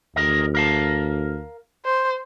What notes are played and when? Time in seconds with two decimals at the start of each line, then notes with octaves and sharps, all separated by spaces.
0.16 D2 G#4 A#4 D#5
0.55 A#4 F5 A5
1.85 C5